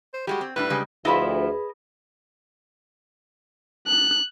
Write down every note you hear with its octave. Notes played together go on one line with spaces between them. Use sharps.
C5
G3 G#3 F#4 G4
C4
A2 G3 D4 B4
C#3 G3 G#3
D2 F3 E4 G#4 B4 D#5 A5 B5
F#6